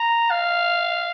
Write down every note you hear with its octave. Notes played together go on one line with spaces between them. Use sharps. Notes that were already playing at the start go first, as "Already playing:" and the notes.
Already playing: A#5
F5